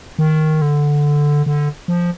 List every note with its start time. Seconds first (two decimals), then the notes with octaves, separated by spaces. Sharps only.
0.19 D#3
0.62 D3
1.46 D3
1.88 F3